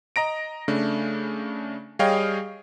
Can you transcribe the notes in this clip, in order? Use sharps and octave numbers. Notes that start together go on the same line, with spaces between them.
D#5 A#5 A#6 D7
C#3 A3 D4
G3 G#4 C#5 D#5 F5 G5